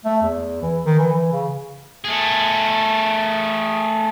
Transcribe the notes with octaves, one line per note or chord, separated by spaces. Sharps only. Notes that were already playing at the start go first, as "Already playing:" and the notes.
A3
E2
E3
D#3
E3
E3
C#3
A3 G#4